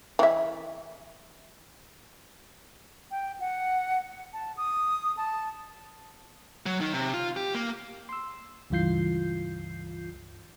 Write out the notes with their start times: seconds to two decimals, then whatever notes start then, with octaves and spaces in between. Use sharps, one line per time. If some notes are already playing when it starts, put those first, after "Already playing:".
0.19 E3 E5
3.11 G5
3.40 F#5
4.33 A5
4.57 D#6
5.17 A5
6.66 F#3
6.81 D#3
6.94 C3
7.14 F4
7.36 G4
7.55 A#3
8.09 C6 E6
8.70 C#2 G2 E3 F4 G6 C7